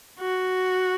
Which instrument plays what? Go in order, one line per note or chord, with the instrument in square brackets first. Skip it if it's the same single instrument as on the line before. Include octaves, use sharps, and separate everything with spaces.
[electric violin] F#4